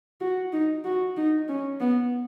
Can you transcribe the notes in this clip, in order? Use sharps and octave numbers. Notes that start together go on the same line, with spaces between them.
F#4
D#4
F#4
D#4
C#4
B3